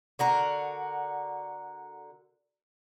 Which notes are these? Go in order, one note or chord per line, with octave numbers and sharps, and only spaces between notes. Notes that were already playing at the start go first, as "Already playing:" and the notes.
D3 F#4 A#4